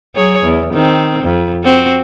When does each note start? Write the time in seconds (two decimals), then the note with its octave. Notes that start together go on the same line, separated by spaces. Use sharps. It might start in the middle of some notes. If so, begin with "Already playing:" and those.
0.15 F#3 G#4 C#5
0.44 E2
0.74 D#3 C4
1.24 F2
1.64 C4 F#4